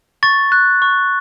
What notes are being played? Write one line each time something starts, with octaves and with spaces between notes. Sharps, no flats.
C#6 A6
F#6
C#6